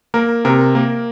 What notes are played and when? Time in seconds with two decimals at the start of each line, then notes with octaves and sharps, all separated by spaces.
0.14 A#3 A#4
0.45 C3 A#4
0.75 A#3